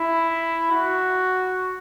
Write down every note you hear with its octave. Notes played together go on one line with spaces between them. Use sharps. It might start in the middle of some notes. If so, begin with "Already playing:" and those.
Already playing: E4
F#4